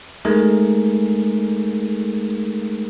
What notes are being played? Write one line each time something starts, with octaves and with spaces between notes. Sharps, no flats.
G#3 A3 D#4 G#4 A#4